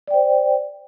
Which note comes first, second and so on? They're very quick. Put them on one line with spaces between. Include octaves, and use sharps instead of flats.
D5 G5 C5